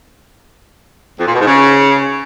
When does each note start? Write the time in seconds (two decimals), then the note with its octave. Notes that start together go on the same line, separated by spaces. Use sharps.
1.19 F2
1.26 A#2
1.33 B2
1.40 G#2
1.47 C#3